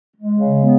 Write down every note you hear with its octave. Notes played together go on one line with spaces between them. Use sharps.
G#3
C#3
B3